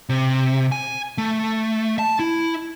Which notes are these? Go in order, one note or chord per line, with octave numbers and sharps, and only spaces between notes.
C3
G#5
A3
A5
E4